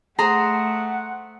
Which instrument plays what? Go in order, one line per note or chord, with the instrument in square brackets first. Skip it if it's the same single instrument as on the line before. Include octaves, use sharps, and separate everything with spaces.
[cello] A3 [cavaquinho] G#4 C5 [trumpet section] F#5 [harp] A#5